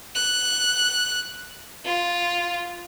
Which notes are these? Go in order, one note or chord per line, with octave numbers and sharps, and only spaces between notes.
F#6
F4